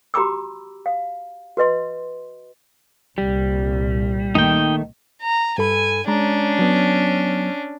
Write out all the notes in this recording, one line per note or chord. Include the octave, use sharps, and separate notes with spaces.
F#4 G4 A#5 B5 D6 E6
F5
F#4 B4 D#5 C6
C2 A#2 G3
D#3 A3 A#3 D#4 G5
A#5
G2 A4 G#5 B5
G#3 C#4 D4 A#5
F#3 B3